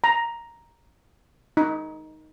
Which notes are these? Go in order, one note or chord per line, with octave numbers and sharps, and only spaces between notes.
A#5
D#4